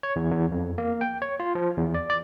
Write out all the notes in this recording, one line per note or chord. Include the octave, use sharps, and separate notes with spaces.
C#5
E2
E2
F2
A#3
G5
C#5
F4
F3
E2
D5
D5